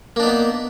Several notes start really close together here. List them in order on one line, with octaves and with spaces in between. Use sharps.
A#3 D4 D#4 B3